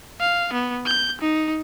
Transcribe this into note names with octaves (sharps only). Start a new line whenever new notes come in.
F5
B3
G6
D#4